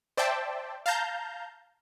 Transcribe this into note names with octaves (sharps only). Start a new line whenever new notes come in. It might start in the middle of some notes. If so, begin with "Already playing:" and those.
C5 D5 E5 G5 A5
F5 A5 A#5 G6